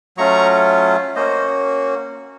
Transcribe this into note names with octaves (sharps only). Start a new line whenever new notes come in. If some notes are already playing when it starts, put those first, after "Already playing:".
F#3 A3 C#4 F4 A#5 C#6
A#3 C#4 F#4 C5 D#5